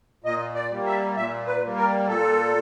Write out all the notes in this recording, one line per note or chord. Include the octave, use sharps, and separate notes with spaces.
A#2 D#5
D5
G3 A#3
E5
A#2 E5
B4
G3 A#3
A#4
A#2 A4